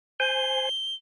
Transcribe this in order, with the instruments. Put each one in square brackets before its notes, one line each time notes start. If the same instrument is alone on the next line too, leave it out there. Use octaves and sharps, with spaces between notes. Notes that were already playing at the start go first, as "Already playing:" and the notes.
[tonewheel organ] C5 G#5 [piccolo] G7